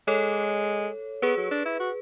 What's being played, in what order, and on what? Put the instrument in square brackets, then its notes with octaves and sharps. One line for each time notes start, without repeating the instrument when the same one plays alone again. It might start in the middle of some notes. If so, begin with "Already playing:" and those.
[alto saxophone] G#3 [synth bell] A4 C#5
[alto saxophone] B3 [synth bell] G#4 B4
[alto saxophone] F#3
D4
E4
F#4